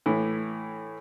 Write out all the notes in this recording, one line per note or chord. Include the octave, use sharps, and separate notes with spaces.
A2 E3